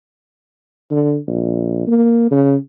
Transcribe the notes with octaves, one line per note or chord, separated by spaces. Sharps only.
D3
A#1
A#3
C#3